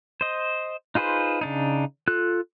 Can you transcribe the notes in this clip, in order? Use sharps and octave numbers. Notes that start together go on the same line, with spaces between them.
C5 D#5
D#4 F4 G#4 B4 C5
C#3 D4 D#4
F4 A4 F#6